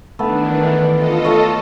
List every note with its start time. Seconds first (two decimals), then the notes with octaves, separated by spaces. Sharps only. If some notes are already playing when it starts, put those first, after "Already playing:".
0.19 D#3 E3 A3 B3 D4 B4
0.90 F4 A4 D#5
1.24 A3 C#5